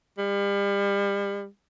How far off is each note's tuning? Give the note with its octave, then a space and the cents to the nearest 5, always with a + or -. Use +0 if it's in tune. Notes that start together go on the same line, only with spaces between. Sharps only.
G3 +35